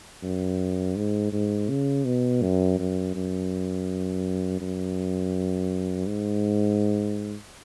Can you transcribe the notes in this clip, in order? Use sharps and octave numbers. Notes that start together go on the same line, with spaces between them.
F#2
G#2
G#2
C#3
B2
F#2
F#2
F#2
F#2
G#2